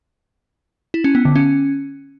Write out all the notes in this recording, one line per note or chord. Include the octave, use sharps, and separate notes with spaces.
E4
C#4
B3
D3
C#4